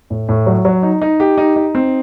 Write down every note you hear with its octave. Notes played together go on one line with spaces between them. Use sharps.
A2
A2
F#3
F#3
D#4
D#4
G4
D#4
D#4
C4